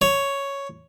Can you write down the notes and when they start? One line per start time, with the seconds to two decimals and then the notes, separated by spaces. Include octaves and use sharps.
0.02 C#5